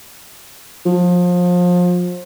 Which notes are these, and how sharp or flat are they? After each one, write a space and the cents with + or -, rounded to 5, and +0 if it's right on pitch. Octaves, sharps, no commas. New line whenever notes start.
F3 +30